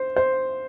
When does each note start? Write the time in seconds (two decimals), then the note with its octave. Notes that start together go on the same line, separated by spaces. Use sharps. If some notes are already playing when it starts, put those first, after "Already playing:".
Already playing: C5
0.16 C5